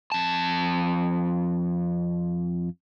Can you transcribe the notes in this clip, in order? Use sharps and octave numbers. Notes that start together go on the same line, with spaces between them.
F2 A5